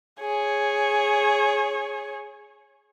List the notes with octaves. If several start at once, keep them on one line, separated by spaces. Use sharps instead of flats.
G#4 C#5